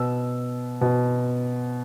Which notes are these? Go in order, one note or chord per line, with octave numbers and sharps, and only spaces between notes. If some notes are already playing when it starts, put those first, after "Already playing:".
Already playing: B2 E6
B2